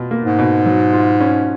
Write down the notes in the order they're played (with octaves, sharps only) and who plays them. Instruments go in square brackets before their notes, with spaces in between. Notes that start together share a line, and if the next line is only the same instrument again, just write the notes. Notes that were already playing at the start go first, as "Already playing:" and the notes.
Already playing: [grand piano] B2 F4
A#3
[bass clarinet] G#2
[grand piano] B2
F#3
F4
C#4